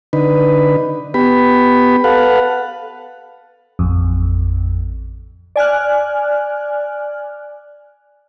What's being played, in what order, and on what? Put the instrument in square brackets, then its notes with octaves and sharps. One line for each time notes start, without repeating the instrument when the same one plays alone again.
[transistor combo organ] D3 D#4 B4
B3 G4 B5
A4 B4 F5 F#5
[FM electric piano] A1 F2
[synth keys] D5 G#5 F6 F#6